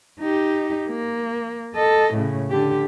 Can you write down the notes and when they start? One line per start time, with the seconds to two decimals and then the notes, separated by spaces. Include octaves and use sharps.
0.20 D#4 G4
0.87 A#3
1.74 A4 D#5
2.14 A2 C#3
2.50 D3 G4